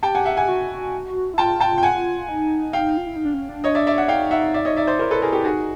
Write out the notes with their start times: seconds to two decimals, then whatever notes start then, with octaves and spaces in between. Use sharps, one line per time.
0.03 G4 G5 A5
0.15 F#5 G#5
0.25 E5 F#5
0.37 F#5 G#5
0.48 F#4
1.34 E4
1.38 F4 G5 A5
1.60 G5 A5
1.78 G5
1.83 F#5 G#5
2.29 D#4
2.73 F5 G5
2.97 F4
3.07 E4
3.16 D#4
3.25 D4
3.34 C#4
3.49 D4
3.64 C#5 D#5
3.75 D5 E5
3.87 D5 E5
3.98 E5 F#5
4.08 D#4 F5 G5
4.31 E5 F#5
4.54 D5 E5
4.65 C#5 D#5
4.77 D5 E5
4.87 C5 D5
4.99 E4 A#4 C5
5.11 A4 B4
5.22 G#4 A#4
5.32 G4 A4
5.44 D#4 F#4 G#4